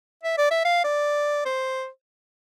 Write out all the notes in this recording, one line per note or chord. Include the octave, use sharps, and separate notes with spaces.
E5
D5
E5
F5
D5
C5